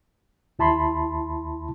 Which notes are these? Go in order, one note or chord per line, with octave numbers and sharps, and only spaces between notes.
D#2 E4 A5 B5 C6